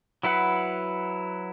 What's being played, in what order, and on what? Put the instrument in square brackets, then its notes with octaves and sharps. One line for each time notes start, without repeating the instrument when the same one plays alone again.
[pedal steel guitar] F#3 E4 B4 F#5